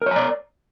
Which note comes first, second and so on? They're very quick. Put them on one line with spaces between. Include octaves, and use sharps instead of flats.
A#4 C#5 A#5 D5